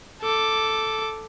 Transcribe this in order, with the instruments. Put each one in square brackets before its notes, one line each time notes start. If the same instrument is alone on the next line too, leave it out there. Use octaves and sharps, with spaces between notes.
[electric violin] A4 D6